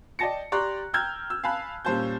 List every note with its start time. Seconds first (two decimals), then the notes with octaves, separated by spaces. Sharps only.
0.19 D5 D#5 G5 A5 A#6 C#7
0.52 G4 D5 A#5 C6 C#6 F#6
0.93 G5 A#5 E6 F6 G6 G#6
1.30 E6
1.43 F5 G#5 A5 B5 F#6
1.85 A#2 G3 C#4 C5 A5 G6